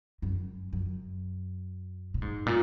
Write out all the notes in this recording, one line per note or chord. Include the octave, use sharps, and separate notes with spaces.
F#2
F#2
A#2
G#2
A#2